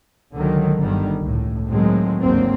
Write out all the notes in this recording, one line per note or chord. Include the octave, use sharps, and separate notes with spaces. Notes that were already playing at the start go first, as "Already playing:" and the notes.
C#2 D3 D#3 F#3
G1 D3 D#3 G3
C#2 A2
A2 D#3 F#3 G#3 C4
G#1 D2 G#2 F#3 A#3 C4